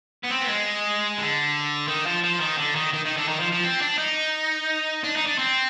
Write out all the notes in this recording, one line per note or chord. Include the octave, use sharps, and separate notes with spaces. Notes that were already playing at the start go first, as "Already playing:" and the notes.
B3
C4
B3
G#3
D3
D#3
F3
F3
D#3
D3
D#3
D#3
D#3
D3
D#3
F3
F3
C4
D4
D#4
D4
D#4
D4
C4